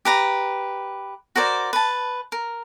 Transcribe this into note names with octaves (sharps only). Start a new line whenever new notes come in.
G4 B4 A#5
F#4 A#4 C5 D5
B4 A5
A#4